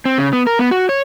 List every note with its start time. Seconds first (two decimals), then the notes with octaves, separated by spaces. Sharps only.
0.05 C4
0.18 C#3
0.33 B3
0.47 A#4
0.59 B3
0.71 F#4
0.89 C#5